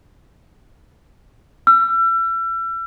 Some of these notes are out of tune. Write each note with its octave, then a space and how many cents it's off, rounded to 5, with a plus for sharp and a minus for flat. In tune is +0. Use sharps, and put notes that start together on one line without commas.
E6 +40